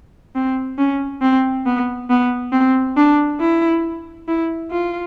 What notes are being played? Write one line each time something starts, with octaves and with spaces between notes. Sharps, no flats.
C4
C#4
C4
B3
B3
C4
D4
E4
E4
F4